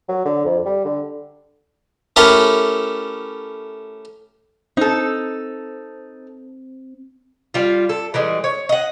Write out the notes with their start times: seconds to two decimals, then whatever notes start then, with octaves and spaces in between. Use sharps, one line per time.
0.09 F#3
0.25 D3
0.46 F2
0.65 G3
0.85 D3
2.16 A3 C#4 E4 G4 A4 A#4
4.77 C4 D#4 A4
7.54 G3 F4
7.89 A4
8.14 E3 G3 G#3
8.44 C#5
8.69 D#5 F#5